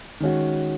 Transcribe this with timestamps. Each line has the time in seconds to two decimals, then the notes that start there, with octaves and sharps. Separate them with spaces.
0.20 D#3 G#3 C#4 F#4